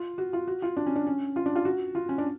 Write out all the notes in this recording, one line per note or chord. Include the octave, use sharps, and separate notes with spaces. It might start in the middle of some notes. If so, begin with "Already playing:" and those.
Already playing: F4
F#4
F4
F#4
F4
D4
C#4
D4
C#4
F4
D4
F4
F#4
F4
C#4
D4